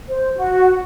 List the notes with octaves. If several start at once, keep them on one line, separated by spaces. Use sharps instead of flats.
C5
F#4